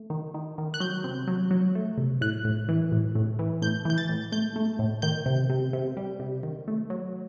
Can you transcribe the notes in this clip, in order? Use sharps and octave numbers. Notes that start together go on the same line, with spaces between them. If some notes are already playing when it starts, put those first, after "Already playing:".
Already playing: A3
D#3
D#3
D#3
F#6
F#3 G6
C3
F#3
F#3
A3
C3
A2 F#6
A2
E3
A2
A2
E3
A2 G6
E3 G6
A6
A2
A3 G6
A3
A2
D#3 G6
C3
C3
C3
G3
C3
D#3
A3
F#3